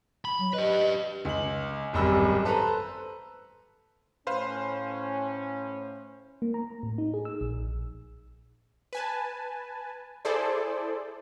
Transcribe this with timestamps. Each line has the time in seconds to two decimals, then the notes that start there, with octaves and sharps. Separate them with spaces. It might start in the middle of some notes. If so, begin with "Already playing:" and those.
0.25 B5
0.39 F#3
0.54 G4 B4 D#5
1.25 C#2 F#7
1.93 D1 G#1 F#2 G3 E6
2.45 A4 B4 C5 A#5
4.27 A2 C#4 B4 C5 F5
6.42 A#3
6.54 A#5
6.83 A2
6.98 D#4
7.14 G#4
7.25 E6
7.41 A#1
8.93 B4 G#5 A5
10.25 E4 G#4 A4 C5 D5